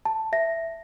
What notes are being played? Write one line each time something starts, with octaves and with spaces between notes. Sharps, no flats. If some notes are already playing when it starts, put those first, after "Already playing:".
A5
E5 A#6